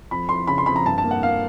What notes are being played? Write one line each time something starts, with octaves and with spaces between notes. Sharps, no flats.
F2 B5
F2 C6
C#3 B5
C6
F2 B5
A#5
G2 A5
A5
A#3
F#5
A#3 F5